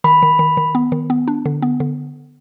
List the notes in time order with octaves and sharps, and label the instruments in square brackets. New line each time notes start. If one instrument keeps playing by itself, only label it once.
[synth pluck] D#3 [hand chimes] B5
[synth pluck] D#3
D#3
D#3
B3
D#3
B3
D4
D3
B3
D3